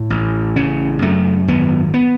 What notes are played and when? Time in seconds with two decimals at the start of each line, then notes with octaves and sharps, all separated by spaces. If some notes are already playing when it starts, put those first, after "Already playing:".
Already playing: A2
0.10 A1
0.56 C#3 C#4
1.02 F#2 A3
1.48 G#1 B3
1.94 B3